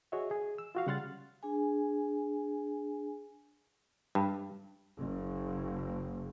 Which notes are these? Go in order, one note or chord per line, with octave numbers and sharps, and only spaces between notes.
F#4 G#4 C#5 D#5 E5
G#4
E6
F4 F#4 F5
C#3 G3 F#5 C6 F6 A6
D4 G#4 G#5
G2
F#1